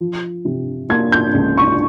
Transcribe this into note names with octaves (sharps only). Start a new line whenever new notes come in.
F3
C3
A#3 G#6
G6
C#2
C#6